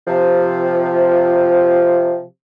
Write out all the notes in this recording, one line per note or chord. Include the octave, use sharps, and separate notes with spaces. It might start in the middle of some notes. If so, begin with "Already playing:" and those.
C3 F3